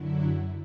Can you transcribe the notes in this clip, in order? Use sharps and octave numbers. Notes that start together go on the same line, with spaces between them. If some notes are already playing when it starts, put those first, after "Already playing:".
Already playing: F#2 D3 F#3 E4